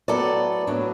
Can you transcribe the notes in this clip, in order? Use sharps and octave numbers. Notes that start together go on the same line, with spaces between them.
A2 F#3 B3 A4 D5
A2 F#3 B3 D4